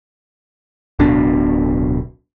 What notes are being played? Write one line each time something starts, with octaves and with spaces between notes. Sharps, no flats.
D1 B1 B2 D4